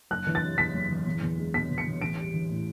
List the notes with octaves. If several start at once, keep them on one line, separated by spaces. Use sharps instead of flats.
F#1 F#6
E3
A6
C3
E2 B6
F#1
E3
E2
E2
G#3
B2 B6
E2
C#7
E2
A1 D7
G3
E3
A2